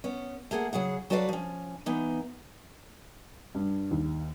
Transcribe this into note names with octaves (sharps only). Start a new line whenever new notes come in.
B3 C#4
A3 A#3 G#4 F5 F#5
C#3 F#3 G#4 F#5
F#3 F#4 A4 B4 D5 F5
F3 C#4
E3 B3 D#4
G2
D#2